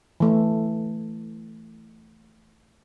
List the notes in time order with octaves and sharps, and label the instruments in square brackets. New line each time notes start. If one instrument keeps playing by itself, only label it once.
[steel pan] E3 A3